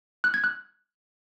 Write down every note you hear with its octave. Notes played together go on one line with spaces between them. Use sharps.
F#6
G#6
F#6